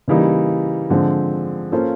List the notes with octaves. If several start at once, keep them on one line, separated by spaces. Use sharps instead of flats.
C#3 E3 G3 A#3 D#4
D3 F3 G#3 C4
A#3 C#4 F4 A4 C5